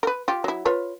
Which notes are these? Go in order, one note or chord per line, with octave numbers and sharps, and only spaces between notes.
A#4 B4
F4 G4
F#3 E4
F4 B4 C#5